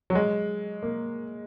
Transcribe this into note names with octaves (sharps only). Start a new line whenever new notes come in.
F#3
G#3
A#3